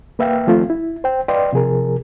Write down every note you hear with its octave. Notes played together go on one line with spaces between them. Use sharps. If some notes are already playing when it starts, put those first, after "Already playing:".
A#3 B4 E5 F5 G5
D#3 F3 A3 C4 F4
E4
C5 G5
B4 D5 D#5 F5 G5 C6
C3 F3 G#4 A#4